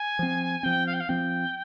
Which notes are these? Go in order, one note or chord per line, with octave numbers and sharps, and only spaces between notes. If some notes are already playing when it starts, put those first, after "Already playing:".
Already playing: G#5
F3 C4
F3 C4 G5
F5
G5
F5
F3 C4 G5